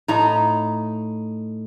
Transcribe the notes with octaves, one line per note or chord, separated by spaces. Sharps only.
A2 D#4